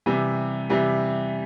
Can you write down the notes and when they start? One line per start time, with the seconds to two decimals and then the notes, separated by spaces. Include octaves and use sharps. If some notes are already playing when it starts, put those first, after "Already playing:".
0.06 C3 E3 G3
0.70 C3 E3 G3